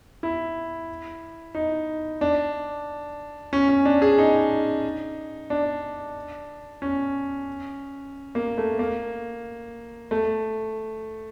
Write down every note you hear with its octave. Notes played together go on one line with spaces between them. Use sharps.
E4
D#4
D4
C#4
C#4
D4
G#4
D#4
D4
C#4
A#3
A3
A#3
A3